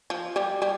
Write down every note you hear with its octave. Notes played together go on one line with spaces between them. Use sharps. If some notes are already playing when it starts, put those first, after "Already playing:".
F3
G3
G3